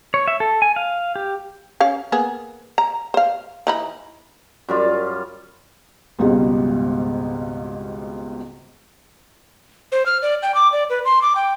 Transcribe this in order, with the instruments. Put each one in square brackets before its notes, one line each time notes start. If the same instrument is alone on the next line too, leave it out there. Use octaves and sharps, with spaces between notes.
[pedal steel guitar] C#5
E5
A4
G#5
F5
G4
[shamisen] C#4 F5
A#3 B3 G#4
A#5
C5 F5
E3 D#4 B5
[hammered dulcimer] F#2 G3 F4
[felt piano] G#1 C#2 G#2 B2 G3
[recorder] C5
F6
D5
G5
D6
D5
B4
C6
D6
G5